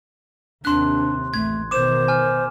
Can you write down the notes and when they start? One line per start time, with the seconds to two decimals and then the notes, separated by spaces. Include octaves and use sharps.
0.65 D#2 C3 D4 C6 F#6
1.34 A1 A3 G#6
1.71 B2 D#3 C5 D6 E7
2.08 G#5 F6